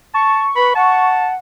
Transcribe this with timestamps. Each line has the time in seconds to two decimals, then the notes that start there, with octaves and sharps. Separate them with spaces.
0.14 A5 C#6
0.56 B4 B5
0.75 F#5 A5